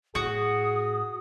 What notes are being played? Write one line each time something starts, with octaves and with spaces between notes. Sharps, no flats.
A2 F#4 G#4 D#6